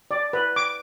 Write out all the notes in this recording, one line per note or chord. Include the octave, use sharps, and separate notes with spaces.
D5
B4
D6